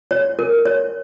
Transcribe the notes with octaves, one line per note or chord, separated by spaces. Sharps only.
C#5
A#4
C#5